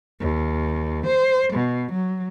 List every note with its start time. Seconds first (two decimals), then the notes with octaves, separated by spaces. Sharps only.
0.21 D#2
1.06 C5
1.54 B2
1.92 F#3